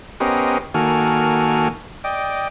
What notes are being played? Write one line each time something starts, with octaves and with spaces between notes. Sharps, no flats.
B3 C#4 G4 A#4 C5 D#5
D#3 A#3 F#4 A4 G#5 F6
D5 D#5 G5